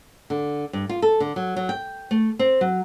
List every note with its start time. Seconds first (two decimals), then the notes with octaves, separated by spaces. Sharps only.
0.30 D3
0.73 G2
0.89 F4
1.02 A4
1.20 D3
1.36 F#3
1.56 F#3
1.69 G5
2.11 A3
2.39 C4
2.61 F#3